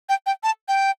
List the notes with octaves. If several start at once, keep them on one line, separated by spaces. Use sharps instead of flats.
G5
G5
A5
G5